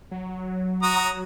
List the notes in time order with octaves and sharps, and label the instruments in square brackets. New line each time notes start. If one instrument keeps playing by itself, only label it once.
[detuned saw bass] F#3
[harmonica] F#4 A#5 D#6